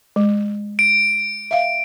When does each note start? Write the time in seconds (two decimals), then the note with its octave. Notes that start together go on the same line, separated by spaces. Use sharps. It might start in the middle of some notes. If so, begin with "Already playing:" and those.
0.16 G#3
0.79 D7
1.51 E5 F5